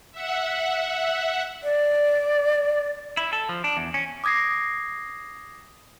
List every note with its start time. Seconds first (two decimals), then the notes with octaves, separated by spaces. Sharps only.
0.12 E5 F#5
1.63 D5
3.17 E4
3.33 A4
3.49 F3
3.64 D4
3.77 E2
3.94 C#4
4.24 D6 D#6 G#6 A#6 C7